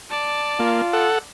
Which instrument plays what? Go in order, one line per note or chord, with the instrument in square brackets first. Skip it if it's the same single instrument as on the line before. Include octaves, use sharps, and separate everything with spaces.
[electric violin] D5 A5
[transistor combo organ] A#3 [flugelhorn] F4
[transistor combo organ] A4 F#5